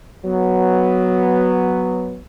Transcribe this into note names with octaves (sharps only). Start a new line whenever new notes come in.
F#3 B3